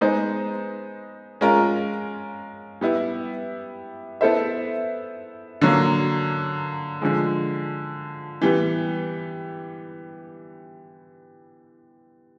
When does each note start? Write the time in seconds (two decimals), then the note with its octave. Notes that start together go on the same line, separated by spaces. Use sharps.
0.01 G#3 B3 D#4 G#4 C5
1.41 G#3 C#4 F4 A#4
2.81 G3 B3 E4
4.21 B3 E4 A4 C5 E5
5.61 D3 F#3 A#3
7.01 D3 F3 G#3
8.41 E3 G3 B3